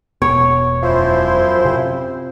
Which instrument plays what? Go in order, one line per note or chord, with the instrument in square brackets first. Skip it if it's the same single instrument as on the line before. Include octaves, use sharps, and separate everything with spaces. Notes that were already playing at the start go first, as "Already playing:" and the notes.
[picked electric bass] E1 B2 B3 [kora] C#5
[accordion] F#2 E4 C5 [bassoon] F3
[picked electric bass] C3